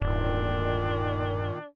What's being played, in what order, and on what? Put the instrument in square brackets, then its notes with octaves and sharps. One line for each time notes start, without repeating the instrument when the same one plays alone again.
[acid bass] D1 [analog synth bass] G2 [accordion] A#2 D#3 [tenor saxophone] D4